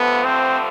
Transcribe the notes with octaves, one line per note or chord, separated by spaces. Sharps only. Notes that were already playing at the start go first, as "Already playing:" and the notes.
Already playing: G2 D3 F3 A3 B3
C4